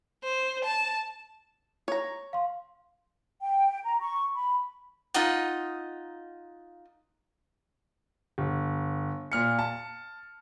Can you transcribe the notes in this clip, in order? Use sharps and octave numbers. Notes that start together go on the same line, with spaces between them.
C5
A5
C#5 A#5
F5 C6
G5
A#5
C#6
B5
D#4 F4 D#5 F#5
G1
A#2 F6 C#7
A5